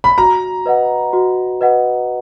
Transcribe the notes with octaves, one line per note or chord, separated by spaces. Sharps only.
B5
F#4 A#5
B4 D#5 F#5
F#4
B4 D#5 F#5